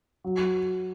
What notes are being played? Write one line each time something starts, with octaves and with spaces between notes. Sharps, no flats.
F#3